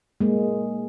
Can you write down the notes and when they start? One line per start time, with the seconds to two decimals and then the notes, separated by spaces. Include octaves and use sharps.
0.21 G#3 A#3